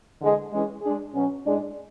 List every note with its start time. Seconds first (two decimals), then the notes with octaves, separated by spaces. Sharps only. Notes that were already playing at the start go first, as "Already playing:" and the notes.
0.20 E2 D3 G#3
0.52 E3 G#3 C#4 G#4
0.82 G#3 D4 G#4
1.14 B2 F#3 C#4
1.45 A2 G#3 D4 G#4 D5